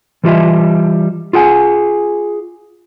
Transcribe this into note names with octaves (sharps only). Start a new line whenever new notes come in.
E3 G3 F4 D#5 E5
F4 G#4 F#5 G#5